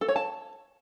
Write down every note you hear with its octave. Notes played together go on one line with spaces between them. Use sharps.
A4
C#5
A5